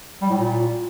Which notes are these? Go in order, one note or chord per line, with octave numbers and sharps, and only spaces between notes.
G3
A2
A#2